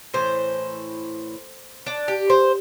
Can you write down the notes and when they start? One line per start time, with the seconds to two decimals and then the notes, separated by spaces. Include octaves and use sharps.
0.14 A2 E3 C5
1.86 D4
2.08 G4
2.30 C5